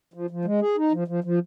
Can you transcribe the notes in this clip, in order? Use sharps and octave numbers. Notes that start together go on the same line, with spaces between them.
F3
F3
G#3
G#4
D#4
F3
F3
F3